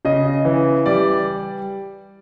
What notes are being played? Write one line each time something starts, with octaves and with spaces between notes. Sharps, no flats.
C#3 D#5
E3
G3 D5